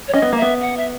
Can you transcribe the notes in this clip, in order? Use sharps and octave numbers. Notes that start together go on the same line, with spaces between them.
C#5
C#4 D#5
B3
A#3
B3 E5
F#5
E5